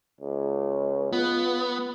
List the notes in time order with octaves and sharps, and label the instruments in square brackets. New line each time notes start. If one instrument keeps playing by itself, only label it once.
[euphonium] C#2
[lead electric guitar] B3 [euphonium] F4